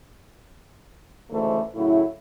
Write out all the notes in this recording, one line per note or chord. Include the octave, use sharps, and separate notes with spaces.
D2 G#2 C#3 E3 A3 C5
A2 C#3 F#3 A3 E4